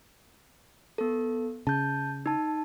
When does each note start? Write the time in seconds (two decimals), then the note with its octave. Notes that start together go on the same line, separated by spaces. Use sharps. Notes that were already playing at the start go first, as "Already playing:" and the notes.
0.98 B3 A4
1.67 C#3 A5 G6
2.26 D#4 A5